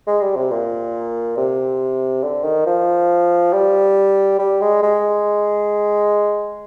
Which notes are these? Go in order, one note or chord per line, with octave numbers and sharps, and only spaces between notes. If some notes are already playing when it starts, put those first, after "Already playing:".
G#3
G3
C3
A#2
C3
D3
D#3
F3
G3
G3
G#3
G#3